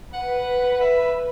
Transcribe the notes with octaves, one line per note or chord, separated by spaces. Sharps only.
B4 F#5
E5